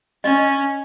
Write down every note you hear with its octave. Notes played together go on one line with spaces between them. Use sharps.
C#4 D#5